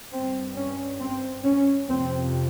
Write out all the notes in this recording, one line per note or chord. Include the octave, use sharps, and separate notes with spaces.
G2 C4
C#4
C4
C#4
F2 C3 C4